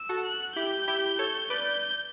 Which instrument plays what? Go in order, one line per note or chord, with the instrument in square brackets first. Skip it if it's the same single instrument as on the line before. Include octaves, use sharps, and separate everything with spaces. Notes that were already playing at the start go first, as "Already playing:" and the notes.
Already playing: [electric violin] E6
[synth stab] F#4 A4
[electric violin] F#6
[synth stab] E4 G4 [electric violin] G6
[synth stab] E4 G4
A4 C#5
[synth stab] B4 D5 [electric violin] G6